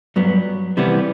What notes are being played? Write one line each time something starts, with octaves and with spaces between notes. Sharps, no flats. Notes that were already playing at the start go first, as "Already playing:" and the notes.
G2 F#3 B3
C3 E3 G3 B3